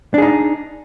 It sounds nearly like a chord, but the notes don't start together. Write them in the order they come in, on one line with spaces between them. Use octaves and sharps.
D4 G#4 D#4